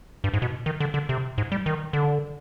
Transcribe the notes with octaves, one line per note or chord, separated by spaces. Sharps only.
G2
G#2
B2
D#3
D3
D3
C3
G#2
G3
D#3
D3